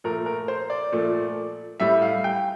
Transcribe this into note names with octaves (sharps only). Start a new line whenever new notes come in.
A#2 F3 A3 A#4
A#4
C5
D5
A#2 F3 A3
A2 G3 E5
F5
G5